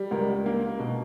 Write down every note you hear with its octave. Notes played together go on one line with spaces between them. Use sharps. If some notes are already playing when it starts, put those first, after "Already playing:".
Already playing: G3
C#2 A#4
A#3
B2